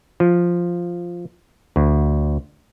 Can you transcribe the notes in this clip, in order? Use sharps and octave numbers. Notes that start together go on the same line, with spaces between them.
F3
D2